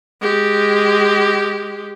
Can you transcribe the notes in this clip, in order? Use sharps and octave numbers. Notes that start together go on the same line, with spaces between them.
G#3 G4